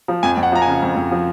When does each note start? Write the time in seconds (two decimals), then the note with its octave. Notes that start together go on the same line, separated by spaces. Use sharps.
0.08 F3
0.23 F2 G#5
0.37 F2
0.43 F#5
0.52 F3 A#5
0.62 G#5
0.66 C#3
0.82 F2
0.96 F2
1.11 F3